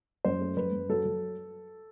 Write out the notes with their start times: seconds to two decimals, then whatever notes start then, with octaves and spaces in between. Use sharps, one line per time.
0.25 F#2 C5
0.41 A3
0.57 F#2 B4
0.72 F#2
0.89 F#3 A4
1.05 F#3